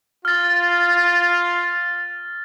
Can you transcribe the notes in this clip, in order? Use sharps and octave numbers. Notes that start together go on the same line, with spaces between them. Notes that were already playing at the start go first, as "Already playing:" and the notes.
F4 F6 A6